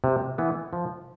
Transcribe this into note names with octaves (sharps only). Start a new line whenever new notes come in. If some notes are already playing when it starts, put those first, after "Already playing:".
C3
E3 B3
F3